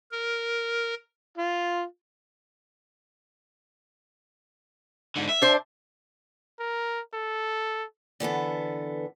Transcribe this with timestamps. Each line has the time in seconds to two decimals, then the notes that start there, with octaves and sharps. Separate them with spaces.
0.11 A#4
1.37 F4
5.16 G#2 D3
5.29 E5
5.42 D4 C5
6.59 A#4
7.14 A4
8.20 D3 E3 B3 A4